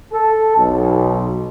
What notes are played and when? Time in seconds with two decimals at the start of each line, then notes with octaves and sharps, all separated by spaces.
0.12 A4
0.56 B1